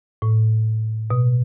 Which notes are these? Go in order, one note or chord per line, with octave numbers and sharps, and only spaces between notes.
A2
B2